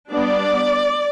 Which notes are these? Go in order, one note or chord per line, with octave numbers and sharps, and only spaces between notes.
G3 B3 D4 D5